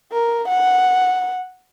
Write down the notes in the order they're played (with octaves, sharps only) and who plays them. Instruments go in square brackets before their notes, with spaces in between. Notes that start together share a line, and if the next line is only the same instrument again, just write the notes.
[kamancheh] A#4
F#5